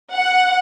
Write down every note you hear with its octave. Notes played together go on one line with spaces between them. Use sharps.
F#5